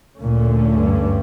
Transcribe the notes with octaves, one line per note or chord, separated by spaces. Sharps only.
D2 A#2 D3 A3 C#4
G2